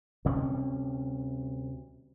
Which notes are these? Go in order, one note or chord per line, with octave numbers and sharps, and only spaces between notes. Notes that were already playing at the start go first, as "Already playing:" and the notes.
D2 C3 G3 C#4